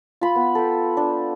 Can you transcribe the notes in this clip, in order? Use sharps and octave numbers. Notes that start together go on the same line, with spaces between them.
F4 B5
B3
A4 G5
D4